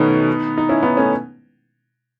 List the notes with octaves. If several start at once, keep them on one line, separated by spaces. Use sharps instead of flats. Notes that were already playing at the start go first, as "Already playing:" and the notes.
Already playing: B2 D#3 A3 B3 C#4 D#4
D#4
C#4 E4
B3 D#4
A3 C#4